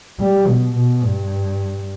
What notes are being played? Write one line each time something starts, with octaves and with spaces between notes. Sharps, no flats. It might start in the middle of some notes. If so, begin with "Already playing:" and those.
G3
B2
B2
G2